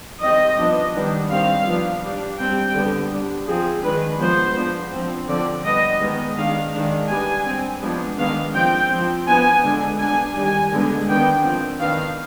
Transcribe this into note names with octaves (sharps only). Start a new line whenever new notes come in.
D#3 G3 C4 D#5
F3 B3 D4
D#3 G3 B3 D4
D#3 G3 C4 F5
F3 B3 D4
G3 D4
G3 C4 G5
D3 G3 B3
G3 D4
F3 C4 G#4
D#3 G#3 D4 B4
F3 G#3 B3 C5
F3 B3 D4
F3 C4
D3 F3 C4 D5
G3 B3 D4 D#5
D#3 G#3 B3
D#3 G#3 D4 F5
D#3 G#3 D4
G3 B3 D4 G#5
G3 C4
F3 G#3 B3 D4
D#3 G#3 B3 D4 F5
F3 C4 G5
F3 C4
F3 B3 D4 G#5
D3 G#3 D4
G3 B3 D4 G#5
D#3 G3 D4 G#5
D3 G#3 B3 D4
D#3 B3 D4 G5
F3 C4
D#3 B3 D4 F5